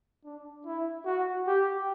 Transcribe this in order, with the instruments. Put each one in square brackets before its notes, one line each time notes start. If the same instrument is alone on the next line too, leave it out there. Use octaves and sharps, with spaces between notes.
[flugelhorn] D4
E4
F#4
G4